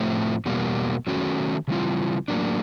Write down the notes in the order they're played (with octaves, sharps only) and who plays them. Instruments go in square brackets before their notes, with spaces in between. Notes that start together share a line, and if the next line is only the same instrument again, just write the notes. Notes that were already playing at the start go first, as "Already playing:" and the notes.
Already playing: [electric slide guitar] A2 F3 A3 C4
E2 B2 G3 A#3
D#3 F#3 A3 C#4 F#4
C#3 E3 G3 C4 F4
A2 F#3 A#3 D4